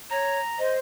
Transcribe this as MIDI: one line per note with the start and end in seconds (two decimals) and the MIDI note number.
0.11 0.40 73
0.11 0.59 82
0.59 0.79 72
0.59 0.75 75